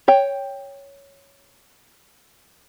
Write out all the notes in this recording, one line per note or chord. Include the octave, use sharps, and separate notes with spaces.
C#5 G5